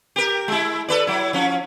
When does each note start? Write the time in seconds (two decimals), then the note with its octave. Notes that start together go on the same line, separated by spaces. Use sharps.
0.16 G4 A#4
0.48 G#3 E4
0.89 A4 B4 D5
1.07 F#3 E4
1.33 F3 C#4